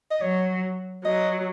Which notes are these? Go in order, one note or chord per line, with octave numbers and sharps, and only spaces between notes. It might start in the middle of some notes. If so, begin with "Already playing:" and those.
D#5
F#3 C#5
F#3 D#5